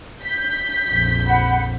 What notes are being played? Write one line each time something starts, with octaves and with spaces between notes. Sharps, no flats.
G6 B6
A#1 F2
F#5 B5